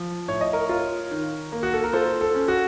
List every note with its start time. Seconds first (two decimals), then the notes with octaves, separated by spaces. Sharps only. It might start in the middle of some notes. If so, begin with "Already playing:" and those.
Already playing: F3
0.28 A2 C#5
0.41 D#5
0.53 A#4 C#5
0.69 F4
1.11 D#3
1.52 A#3
1.63 F#4
1.73 A4
1.84 A#4
1.93 F4 A4 C5
2.21 A4
2.35 C#4
2.48 F#4